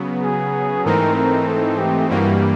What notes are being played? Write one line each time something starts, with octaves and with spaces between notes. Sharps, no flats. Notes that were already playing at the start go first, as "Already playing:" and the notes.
Already playing: C#3 F#3 B3
G#4
G#2 E3 A3 C4 D#4 A#4
A#4
A4
G4
G2 E3 G3 A#3 F#4